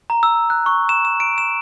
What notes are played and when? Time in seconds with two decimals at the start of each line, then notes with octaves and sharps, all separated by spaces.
0.10 A#5
0.23 E6
0.50 F#6
0.66 C#6
0.89 E7
1.05 E7
1.20 D7
1.38 E7